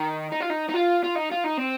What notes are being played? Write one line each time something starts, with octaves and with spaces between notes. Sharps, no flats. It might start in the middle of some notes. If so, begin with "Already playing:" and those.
Already playing: D#3
D#4
F4
D#4
D#4
F4
F4
D#4
F4
D#4
C4